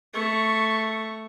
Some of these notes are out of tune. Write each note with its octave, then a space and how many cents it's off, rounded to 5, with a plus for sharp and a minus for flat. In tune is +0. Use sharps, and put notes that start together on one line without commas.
A3 +0 C#6 +0